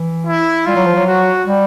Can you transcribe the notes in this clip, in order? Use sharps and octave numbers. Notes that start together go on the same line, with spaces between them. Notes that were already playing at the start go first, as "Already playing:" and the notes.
Already playing: E3
E4
G3 F4
F#3
F3
F#3
F#4
G3